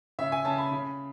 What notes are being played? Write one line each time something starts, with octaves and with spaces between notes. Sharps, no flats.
C#3 E5
G#5
C#3 A5
B5
C#3